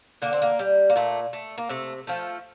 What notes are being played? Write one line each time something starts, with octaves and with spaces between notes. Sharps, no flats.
D3 A#3
C4
A#3
G3
A#3
A#2 A3
A3
A#3
C3 A3
F3 A3